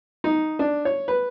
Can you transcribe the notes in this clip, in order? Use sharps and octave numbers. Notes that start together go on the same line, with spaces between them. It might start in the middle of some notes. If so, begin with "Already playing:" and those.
D#4
D4
C#5
B4